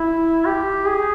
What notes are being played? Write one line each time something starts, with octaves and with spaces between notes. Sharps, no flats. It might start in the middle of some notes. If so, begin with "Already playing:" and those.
Already playing: E4
G4
G#4